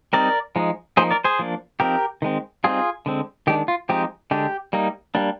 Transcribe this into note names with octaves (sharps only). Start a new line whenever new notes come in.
G3 C4 D#4 A#4 D5
F3 G#3 D#4
F3 A#3 D#4 G#4 C5
A#4 D5
G#4 C5
F3 A#3 D4
F3 C4 D#4 G4 A#4
D#3 G#3 C4
G3 C4 D#4 F4 G#4
D3 G#3 C4
D#3 G#3 D4 G4
F4
F3 G#3 C4 D#4 G4
D3 G#3 D4 G4
G3 A#3 D#4
G3 A#3 D4